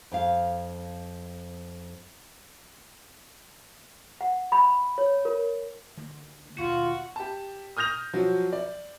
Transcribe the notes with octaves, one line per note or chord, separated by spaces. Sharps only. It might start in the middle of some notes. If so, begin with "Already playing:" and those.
F2 F5
F#5
B5
C#5
A#4
D3 A3 A#3
D#2 B2 D#3 F4 F#4
G4 A5
D#6 F6 G6 A#6 F7
F3 F#3 F#4
D5